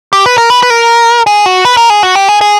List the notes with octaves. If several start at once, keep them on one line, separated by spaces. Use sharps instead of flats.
G4
B4
A#4
B4
B4
A#4
G#4
F#4
B4
A#4
G#4
F#4
G4
G#4
G#4